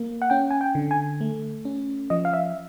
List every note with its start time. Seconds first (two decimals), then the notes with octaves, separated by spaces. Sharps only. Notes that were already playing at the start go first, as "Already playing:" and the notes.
Already playing: A#3
0.22 F#5
0.30 C#4 G5
0.51 G#5
0.61 G5
0.75 D3
0.91 G#5
1.21 A3
1.65 C#4
2.10 F3 D#5
2.25 F5
2.33 E5